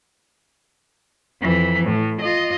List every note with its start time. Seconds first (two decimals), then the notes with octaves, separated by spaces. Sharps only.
1.41 F2 E3
1.84 A2
2.21 F4 D#5